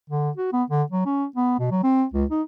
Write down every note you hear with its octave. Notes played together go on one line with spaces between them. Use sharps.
D3
F#4
B3
D3
F#3
C#4
B3
B2
F#3
C4
C#2
D#4